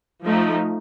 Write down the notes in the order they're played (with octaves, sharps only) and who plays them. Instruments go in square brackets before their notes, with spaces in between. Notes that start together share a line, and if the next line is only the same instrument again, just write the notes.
[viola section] F3 A3 D#4